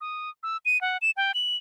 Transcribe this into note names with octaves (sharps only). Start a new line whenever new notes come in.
D#6
E6
D#7
F#5
E7
G5
F#7